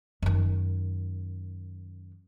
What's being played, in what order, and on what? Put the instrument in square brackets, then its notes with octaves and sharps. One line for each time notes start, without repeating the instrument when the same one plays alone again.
[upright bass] F#2 D#3